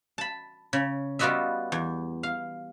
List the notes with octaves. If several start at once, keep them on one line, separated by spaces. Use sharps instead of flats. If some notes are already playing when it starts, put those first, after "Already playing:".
A5 B5
C#3
G3 B3 F4 F#4 D#5 E5
E2
F5